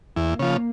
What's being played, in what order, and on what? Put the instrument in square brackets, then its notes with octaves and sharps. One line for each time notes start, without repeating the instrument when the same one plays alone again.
[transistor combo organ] E2 [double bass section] A#3
[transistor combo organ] C#3 F3